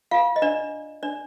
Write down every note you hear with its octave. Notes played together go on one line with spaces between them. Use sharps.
F4 F5
D#5
D4 D5
D4 D5